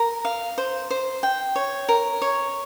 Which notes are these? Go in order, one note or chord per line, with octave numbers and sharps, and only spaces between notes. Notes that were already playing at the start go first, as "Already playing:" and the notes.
Already playing: A#4
F5
C5
C5
G5
C#5
A#4
C#5